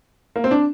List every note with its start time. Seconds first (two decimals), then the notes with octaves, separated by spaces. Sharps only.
0.36 A#3
0.44 C4
0.51 D4